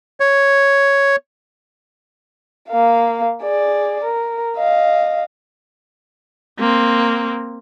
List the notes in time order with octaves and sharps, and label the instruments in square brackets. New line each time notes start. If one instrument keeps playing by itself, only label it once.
[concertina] C#5
[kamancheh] A#3 F5
G#4 D5
A#4
D#5 F5
[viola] A#3 C4